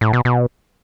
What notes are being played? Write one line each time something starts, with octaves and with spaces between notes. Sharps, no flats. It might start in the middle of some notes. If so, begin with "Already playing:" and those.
A2
B2
B2